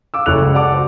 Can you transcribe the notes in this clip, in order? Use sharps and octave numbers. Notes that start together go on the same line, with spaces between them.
F5 D6 E6
F#1 E4 A4 C#6 F#6 F7
C#2
G4 D5 F#5 A5 D6
F#4 C5